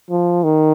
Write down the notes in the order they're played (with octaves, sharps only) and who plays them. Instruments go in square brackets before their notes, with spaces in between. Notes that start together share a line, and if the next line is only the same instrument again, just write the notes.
[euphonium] F3
D#3